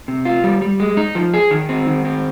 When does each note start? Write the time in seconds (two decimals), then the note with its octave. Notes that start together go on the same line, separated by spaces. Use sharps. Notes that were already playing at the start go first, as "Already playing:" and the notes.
0.08 C3
0.25 F4
0.44 G3
0.62 G3
0.80 G#3
0.97 D#4
1.15 F3
1.34 G#4
1.51 D#3
1.69 C4
1.87 D#3
2.05 C4